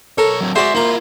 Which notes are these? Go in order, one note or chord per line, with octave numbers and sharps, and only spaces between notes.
B1 A4 A#4 C#5
F#3 C4
G#3 F#4 C5 D5 E5
A#3 E4 F4 A#5